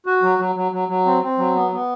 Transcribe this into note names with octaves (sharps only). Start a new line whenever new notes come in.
F#4
F#3
F#3
F#3
F#3
F#3
C4
C4
F#3
B3
B3